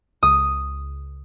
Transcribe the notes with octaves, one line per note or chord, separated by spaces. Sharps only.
C#2 D#6